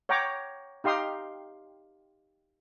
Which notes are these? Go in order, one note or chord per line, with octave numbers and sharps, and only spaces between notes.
C#5 F#5 G5 A#5 D6
D#4 G4 F5 C6 D#6